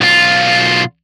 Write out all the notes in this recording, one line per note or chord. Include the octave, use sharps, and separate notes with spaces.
B1 F4